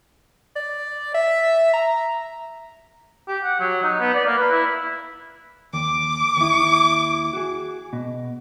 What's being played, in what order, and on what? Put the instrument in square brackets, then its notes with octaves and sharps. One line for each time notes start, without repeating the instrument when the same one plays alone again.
[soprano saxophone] D5
E5
A#5
[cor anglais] G4
F#5
F#3
D#4
B3
D5
A#3
B4
E4
[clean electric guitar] D#2 [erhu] D6
[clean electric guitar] D#2 E4
F#4 G#4
B2